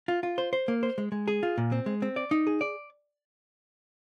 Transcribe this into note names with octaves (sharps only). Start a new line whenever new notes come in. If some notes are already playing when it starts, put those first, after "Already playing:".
F4
F4
C5
C5
A#3
C5
G#3
G#3
G#4
F4
A#2
C4
G#3
C4
D5
D#4
G#4
D5